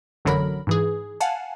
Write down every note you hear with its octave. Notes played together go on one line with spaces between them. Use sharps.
A1 F#2 D3 F#3 A#4 B5
G#2 E3 G#4
F5 F#5 G#5 A5